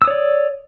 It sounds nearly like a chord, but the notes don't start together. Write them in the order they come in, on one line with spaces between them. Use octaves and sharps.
E6 D#6 C#5 D5